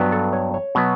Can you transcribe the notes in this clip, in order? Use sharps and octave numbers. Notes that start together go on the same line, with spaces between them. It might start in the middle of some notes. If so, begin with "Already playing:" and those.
Already playing: G2 F#3 B3
A4
C#5
C#5
B2 F#3 B3